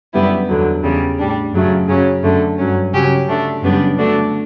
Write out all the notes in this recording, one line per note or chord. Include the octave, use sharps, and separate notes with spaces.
F#2 D3 G3 B3 E4
E2 D3 F#3
E2 C#3 G3
A2 G3 D4
F#2 C#3 F#3 A3
F#2 C#3 F#3 C#4
F#2 D3 A3
G2 F#3 C#4
C#3 F#3 C#4 G4
D3 A3 D4
F#2 C#3 G3 B3 D4
D3 A3 D4 F#4